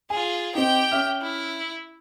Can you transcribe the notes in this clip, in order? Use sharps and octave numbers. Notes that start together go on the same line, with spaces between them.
F4 G#4 G#5
C4 D#4 G4 G5
C#4 E5 F6
E4